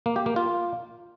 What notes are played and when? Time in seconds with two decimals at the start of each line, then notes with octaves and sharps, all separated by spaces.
0.06 A#3
0.16 G4
0.26 A#3
0.36 F4